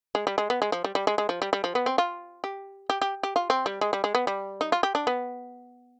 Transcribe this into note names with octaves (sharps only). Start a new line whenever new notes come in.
G#3
G3
G#3
B3
G#3
F3
G3
G3
G#3
G#3
F3
G3
G3
F3
B3
C4
F4
G4
G4
G4
G4
F4
C4
G3
G#3
G3
G#3
B3
G3
D#4
F4
G4
D4
B3